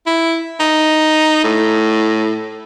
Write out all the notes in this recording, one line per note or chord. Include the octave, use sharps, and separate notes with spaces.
E4
D#4
A2